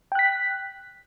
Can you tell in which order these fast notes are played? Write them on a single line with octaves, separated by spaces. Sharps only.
G5 F#6 B6